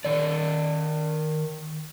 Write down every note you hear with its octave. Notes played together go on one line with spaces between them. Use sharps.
D#3 D5